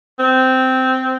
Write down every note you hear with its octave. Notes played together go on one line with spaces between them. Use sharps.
C4